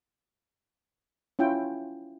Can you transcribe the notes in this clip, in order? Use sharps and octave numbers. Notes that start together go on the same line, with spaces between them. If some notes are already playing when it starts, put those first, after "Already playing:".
C#4 E4 F4 G5